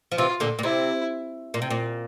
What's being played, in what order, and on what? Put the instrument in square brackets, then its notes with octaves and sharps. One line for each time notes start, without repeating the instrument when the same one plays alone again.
[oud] F3
[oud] C3 E3 [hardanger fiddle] F4
[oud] A#2 D3
A#2
[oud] C3 [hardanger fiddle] E4
[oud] A#2
C3
A#2